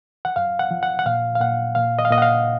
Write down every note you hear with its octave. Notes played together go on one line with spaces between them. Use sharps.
F#5
F#2 F5
F#5
F3
F#5
F#5
A#2 F5
F5
A#2 F#5
A#2 F5
D#5
F5
A#2 D#5
F#5
F5